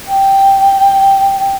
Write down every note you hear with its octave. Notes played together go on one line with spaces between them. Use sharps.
G5